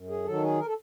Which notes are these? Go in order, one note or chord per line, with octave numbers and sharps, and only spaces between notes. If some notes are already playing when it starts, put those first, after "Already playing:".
Already playing: F#2
G#4
D#3 F#3 A4
G#4
A#4
A4